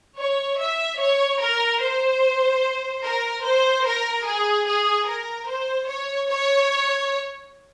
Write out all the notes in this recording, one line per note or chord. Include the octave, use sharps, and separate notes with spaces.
C#5
E5
C#5
A#4
C5
A#4
C5
A#4
G#4
G#4
A#4
C5
C#5
C#5